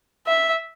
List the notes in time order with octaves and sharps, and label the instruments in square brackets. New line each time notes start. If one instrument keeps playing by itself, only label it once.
[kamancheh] E5